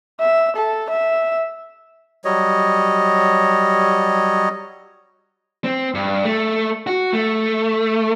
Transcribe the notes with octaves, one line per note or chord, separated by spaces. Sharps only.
E5
A4
E5
F#3 G3 C#5 D#5
C4
G2
A3
F#4
A3